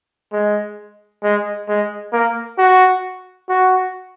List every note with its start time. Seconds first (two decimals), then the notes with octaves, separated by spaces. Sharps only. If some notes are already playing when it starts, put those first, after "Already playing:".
0.32 G#3
1.24 G#3
1.69 G#3
2.13 A#3
2.58 F#4
3.49 F#4